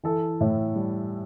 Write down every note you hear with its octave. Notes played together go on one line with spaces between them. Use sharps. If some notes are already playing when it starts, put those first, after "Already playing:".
E3 A4
A2
G3